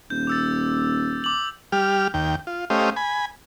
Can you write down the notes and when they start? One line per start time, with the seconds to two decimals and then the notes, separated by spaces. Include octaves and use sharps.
0.10 D#1 G6
0.27 D6 E6 A6
1.24 D6 F#7
1.72 G3 G4 F6
2.14 D#2 G5
2.47 F4
2.70 A3 C#4 G4 C5 D#5 F5
2.96 G#5 B5